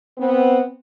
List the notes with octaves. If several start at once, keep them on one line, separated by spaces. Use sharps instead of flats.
B3 C4